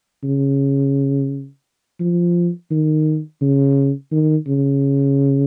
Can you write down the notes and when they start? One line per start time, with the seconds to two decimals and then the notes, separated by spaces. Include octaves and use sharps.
0.24 C#3
2.00 F3
2.71 D#3
3.42 C#3
4.12 D#3
4.47 C#3